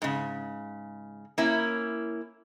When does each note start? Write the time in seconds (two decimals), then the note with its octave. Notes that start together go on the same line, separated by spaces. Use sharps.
0.02 G#2 C#3
1.38 A#3 C#4 E4